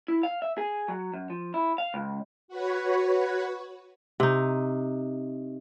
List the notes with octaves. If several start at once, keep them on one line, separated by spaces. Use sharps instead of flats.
E4
F5
E5
G#4
F#3
F#2
F3
E4
F5
C#2
F#4 B4 C#5
C3 D#4